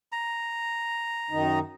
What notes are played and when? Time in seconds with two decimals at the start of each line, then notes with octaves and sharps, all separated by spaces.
0.12 A#5
1.31 F#2 D#3 D#4